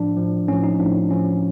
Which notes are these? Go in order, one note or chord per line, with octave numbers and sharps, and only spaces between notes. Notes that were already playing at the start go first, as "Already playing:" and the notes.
Already playing: A2 F3 D4
A2 F3
A2 F3 C#4
D#4
A2 F3 D4
A2 F3 C#4